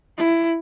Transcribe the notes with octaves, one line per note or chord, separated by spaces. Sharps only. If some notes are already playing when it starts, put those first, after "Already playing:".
E4